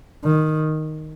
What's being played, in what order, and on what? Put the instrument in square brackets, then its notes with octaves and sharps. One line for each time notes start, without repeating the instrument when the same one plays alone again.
[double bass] D#3